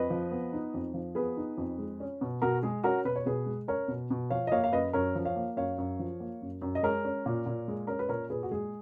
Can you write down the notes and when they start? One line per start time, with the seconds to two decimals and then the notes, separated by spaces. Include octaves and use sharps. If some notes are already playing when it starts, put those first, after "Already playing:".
Already playing: F2 B4 D#5
0.10 F3
0.31 B3
0.53 D#4
0.74 F2
0.94 F3
1.15 B3 G#4 B4
1.37 D#4
1.58 F2
1.78 G#3
2.00 C#4
2.21 B2
2.42 B2 F#4 A#4
2.63 G#3 G#4
2.84 C#4 F#4 A#4
3.05 B2 B4
3.16 C#5
3.26 B2 G#4 B4
3.46 G#3
3.68 C#4 A#4 C#5
3.88 B2
4.10 B2
4.30 F3 C#5 F5
4.47 D#5
4.52 A#3 C#5 F5
4.64 F5
4.72 F#2 B4 D#5
4.93 F#2 A#4 C#5
5.15 F3
5.25 C#5 F5
5.36 A#3
5.56 F#2 C#5 F5
5.78 F#2
5.99 F3
6.20 A#3
6.42 F#2
6.62 F#2
6.75 D#5
6.83 G#3 A#4 C#5
7.05 C#4
7.26 A#2
7.46 A#2
7.68 G#3
7.87 C#4 A#4
7.99 B4
8.09 A#2 A#4 C#5
8.30 A#2 G#4 B4
8.43 F#4
8.51 G#3 G#4